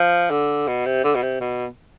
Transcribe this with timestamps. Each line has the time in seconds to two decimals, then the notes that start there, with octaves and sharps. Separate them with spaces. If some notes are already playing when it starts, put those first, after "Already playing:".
Already playing: F3
0.30 D3
0.67 B2
0.86 C3
1.04 D3
1.15 B2
1.22 C3
1.41 B2